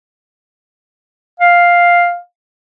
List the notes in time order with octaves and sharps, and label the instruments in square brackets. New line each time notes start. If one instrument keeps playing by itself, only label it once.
[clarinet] F5